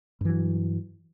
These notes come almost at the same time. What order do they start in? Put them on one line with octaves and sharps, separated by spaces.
G2 E3 F#3